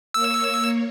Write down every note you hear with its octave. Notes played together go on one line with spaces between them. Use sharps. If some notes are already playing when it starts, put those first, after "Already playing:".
A#3 C#5 E6